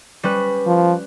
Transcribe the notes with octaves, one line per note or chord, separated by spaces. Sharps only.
G3 C#4 B4
F3